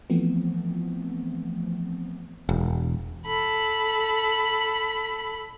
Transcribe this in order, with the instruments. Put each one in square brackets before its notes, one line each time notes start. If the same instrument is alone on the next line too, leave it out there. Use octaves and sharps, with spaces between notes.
[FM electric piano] E3 F3 A3 B3 C4
[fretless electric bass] E1
[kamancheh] A4 B5